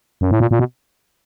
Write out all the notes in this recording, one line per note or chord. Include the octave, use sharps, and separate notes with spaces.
F#2
A2
A#2
A#2
B2